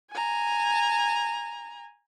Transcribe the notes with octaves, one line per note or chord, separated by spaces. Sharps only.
G#5 A#5